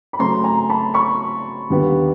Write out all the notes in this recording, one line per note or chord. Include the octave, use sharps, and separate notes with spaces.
B5
C#3 F#3 A3 C4 A#5 C6
G#5 A#5
A5 B5
B5 C#6
D#2 D3 G3 B3